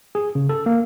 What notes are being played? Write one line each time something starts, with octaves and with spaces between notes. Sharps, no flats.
G#4
C#3
A4
A#3